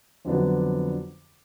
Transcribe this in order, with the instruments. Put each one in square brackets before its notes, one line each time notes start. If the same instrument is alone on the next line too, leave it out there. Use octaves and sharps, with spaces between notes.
[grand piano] F2 D3 F#3 B3 D4